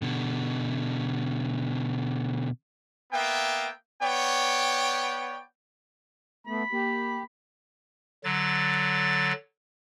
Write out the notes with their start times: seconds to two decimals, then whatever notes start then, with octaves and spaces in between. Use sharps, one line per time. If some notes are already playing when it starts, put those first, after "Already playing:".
0.02 B2 D3
3.13 A#3 B3 E5 G5
4.03 B3 C#5 D5 G5
6.47 A3 B3 B5
6.72 A#3 G4
8.24 D3 F#3 A6